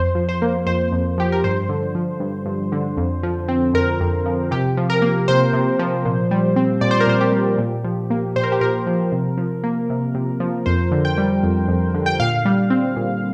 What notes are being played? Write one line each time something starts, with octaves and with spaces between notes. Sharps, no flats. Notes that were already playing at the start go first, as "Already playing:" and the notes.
Already playing: F2 C5
F3
C5
A#3
F2 C5
F2
F3 G4
A#4
G2 C5
D3
F3
G2
G2
D3
F2
F3
C4
F2 A#4
F2
F3
C3 G4
F3
A#4
A#3
C3 C5
C3
F3
A#2
G3
C4
A#2 D5
C5
A#4
A#2 C5
G4
G3
A#2
F3
A#3
A#2 C5
A#4
G4
A#2 A#4
F3
C3
F3
A#3
C3
C3
F3
F2 C5
D3
G5
G3
F2
F2
D3
G5
A#2 F5
G3
C4
A#2